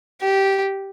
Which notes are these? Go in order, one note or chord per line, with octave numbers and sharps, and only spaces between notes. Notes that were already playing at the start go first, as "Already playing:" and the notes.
G4